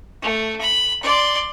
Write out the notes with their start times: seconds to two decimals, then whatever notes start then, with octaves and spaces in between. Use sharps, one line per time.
0.22 A3
0.60 B5
1.03 D5 C6